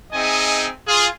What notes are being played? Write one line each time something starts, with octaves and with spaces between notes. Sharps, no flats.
C4 D#4 G#4 D#5 E5 G#5
F4 G#4